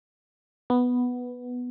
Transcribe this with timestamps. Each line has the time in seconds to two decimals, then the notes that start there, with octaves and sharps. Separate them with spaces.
0.70 B3